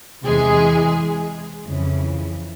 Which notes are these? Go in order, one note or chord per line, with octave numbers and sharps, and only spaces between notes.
E2 C3 E3 G#3 G#4
F2 C#3 E3